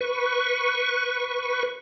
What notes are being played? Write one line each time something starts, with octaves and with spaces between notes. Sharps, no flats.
B4 C#6